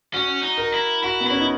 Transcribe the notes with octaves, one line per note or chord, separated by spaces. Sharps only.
C#4 F#4
D#4
A#4
E4
E4 F#4
B3
C#4 E4
D#4